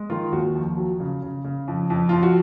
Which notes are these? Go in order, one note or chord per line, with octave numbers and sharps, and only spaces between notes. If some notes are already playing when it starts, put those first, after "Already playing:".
Already playing: G#3
D#3 F4
D#2 F#4
F2
F#3
C#3
C#3
C#3
F2
F2
F2 F4
F#4